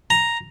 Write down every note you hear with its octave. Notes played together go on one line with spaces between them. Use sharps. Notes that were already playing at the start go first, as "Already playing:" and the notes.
A#5